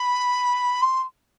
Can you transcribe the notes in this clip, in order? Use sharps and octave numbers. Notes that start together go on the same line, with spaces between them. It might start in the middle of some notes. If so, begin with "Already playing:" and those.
Already playing: B5
C6